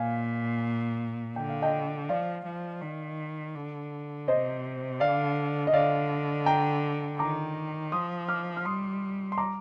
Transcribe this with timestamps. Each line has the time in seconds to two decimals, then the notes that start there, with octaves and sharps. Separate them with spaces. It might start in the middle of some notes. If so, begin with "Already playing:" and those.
Already playing: A#2 F5 G#5
1.36 D3 G5
1.49 F5
1.62 D#5 G5
2.09 F3 D5 F5
2.46 F3
2.82 D#3
3.55 D3
4.28 C3 C5 D#5
5.00 D3 D5 F5
5.67 D#5
5.74 D3 D5 F5
6.46 G5 A#5
7.19 D#3 A#5 D6
7.92 F3 C6 D#6
8.29 D6 F6
8.57 F6
8.65 G3 C6 D#6
9.32 C6
9.38 A#5 D6